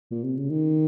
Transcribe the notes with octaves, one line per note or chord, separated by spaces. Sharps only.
A#2
C3
C#3
D#3